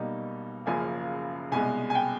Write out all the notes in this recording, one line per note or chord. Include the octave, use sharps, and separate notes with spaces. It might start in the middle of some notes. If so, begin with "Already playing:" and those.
Already playing: B1 B2 G3 A#3 D#4
F#1 F#2 C#3 F3 A#3 G#5
C2 B2 G#3 G#5
G#5
G5